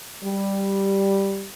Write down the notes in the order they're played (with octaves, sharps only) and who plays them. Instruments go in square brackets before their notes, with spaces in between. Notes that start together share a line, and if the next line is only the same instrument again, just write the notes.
[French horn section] G3